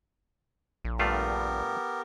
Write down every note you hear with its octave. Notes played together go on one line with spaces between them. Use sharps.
A#1
G2 A3 B3 F4 G4 A#4